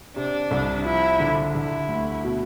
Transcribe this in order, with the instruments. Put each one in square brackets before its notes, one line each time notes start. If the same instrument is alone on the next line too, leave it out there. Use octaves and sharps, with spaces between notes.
[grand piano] C3 [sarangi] D4
[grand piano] C2
[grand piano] F3 [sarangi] E4
[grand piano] D3
[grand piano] D3 [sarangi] E4
[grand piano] D2
B2